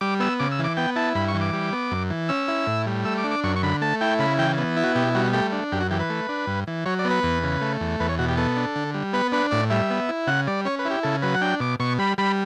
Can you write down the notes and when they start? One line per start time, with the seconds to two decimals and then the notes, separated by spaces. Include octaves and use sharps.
0.01 G3 D6
0.20 B3 E6
0.40 C#3 D6
0.52 E6
0.59 E3
0.64 D6
0.77 B3 G5
0.96 E4 A5
1.15 G2 B5
1.28 C#6
1.35 E3
1.41 D6
1.53 G3
1.73 B3
1.91 F#2
2.10 E3
2.29 C#4 E6
2.48 E4
2.67 A2
2.87 G3
3.05 A3 E6
3.18 D6
3.24 D4
3.31 D6
3.44 F#2 C#6
3.56 C#6
3.63 D3 B5
3.82 A3 A5
4.01 E4 G5
4.19 C#3 B5
4.39 E3 G5
4.58 B3
4.77 E4
4.84 F#4
4.95 B2 G4
5.15 G3 F#4
5.33 A3 G4
5.52 D4
5.72 F#2 G4
5.81 F#4
5.90 E3 G4
6.00 B4
6.10 A3
6.29 D4
6.47 G2
6.67 E3
6.86 F#3 C#5
6.99 D5
7.05 B3
7.10 B4
7.23 E2
7.43 C#3
7.61 A3
7.80 E2
8.00 E2 B4
8.09 C#5
8.19 B2 F#4
8.28 G4
8.37 B3 A4
8.56 D4
8.76 D3
8.94 G3
9.13 B3 B4
9.32 D4 B4
9.51 A2 D5
9.70 G3 E5
9.90 B3
10.09 E4
10.27 C#3 F#5
10.47 G3 D5
10.65 C#4 C#5
10.79 B4
10.85 E4
10.91 G4
11.03 C#3 A4
11.22 F#3 B4
11.34 F#5
11.41 D4 G5
11.60 B2 D6
11.80 B2 C#6
11.99 G3 B5
12.18 G3 B5